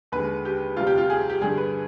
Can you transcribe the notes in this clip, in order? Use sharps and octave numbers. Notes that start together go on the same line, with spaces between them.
D#2 D3 G#3 B4
G4
D2 C3 G3 F4
G4
F4
G#4
G4
G2 D3 G3 G#4
B4